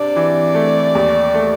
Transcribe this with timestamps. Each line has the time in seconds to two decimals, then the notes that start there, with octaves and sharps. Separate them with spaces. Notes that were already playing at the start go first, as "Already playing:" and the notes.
Already playing: C3 D4 D5
0.16 E3
0.55 A3
0.95 D#2
1.34 A3